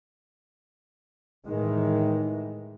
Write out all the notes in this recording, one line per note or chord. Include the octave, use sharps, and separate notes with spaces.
A2 D#3 E3 G#3